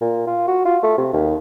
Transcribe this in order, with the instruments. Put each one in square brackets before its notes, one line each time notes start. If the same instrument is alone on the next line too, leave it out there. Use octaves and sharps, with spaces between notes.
[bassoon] A#2
F4
F#4
F4
A3
C3
D#2